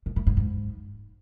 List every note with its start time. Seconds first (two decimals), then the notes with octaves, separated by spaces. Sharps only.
0.06 A2
0.16 A2
0.27 G#2
0.37 G#2